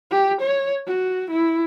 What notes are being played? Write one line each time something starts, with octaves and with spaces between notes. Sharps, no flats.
G4
C#5
F#4
E4